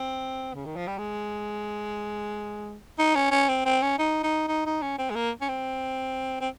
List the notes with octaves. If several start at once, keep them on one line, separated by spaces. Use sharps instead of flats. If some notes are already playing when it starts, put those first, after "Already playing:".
Already playing: C4
C#3
D#3
F3
G3
G#3
D#4
C#4
C#4
C4
C4
C#4
D#4
D#4
D#4
D#4
C#4
C4
G#3
A#3
C#4
C4
C4